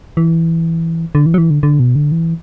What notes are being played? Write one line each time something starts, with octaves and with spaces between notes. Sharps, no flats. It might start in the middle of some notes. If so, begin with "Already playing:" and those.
E3
D3
E3
F#3
E3
D3
D3
B2
D3
E3